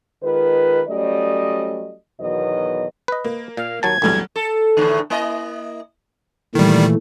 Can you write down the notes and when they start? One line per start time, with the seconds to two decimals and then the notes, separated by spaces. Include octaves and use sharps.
0.23 D#3 G#3 F4 B4
0.88 F#3 G3 A3 C#4 D5 D#5
2.20 E2 B2 D#3 F#3 B4 D#5
3.08 B4 D#5
3.24 A#3
3.57 A#2 F5
3.83 D#2 F#3 A5 G#6
4.02 A#1 E2 F#3 G3 A3
4.36 A4
4.77 E2 A2 D3
5.10 A#3 E4 D#5
6.55 A#2 D#3 E3 G3 A3